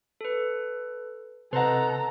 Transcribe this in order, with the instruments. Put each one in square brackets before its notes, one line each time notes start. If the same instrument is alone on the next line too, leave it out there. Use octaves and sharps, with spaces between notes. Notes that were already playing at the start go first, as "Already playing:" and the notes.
[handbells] A4 B4
[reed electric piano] C3 [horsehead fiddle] A4 A#5 [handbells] B4 D#5 [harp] C5 F#5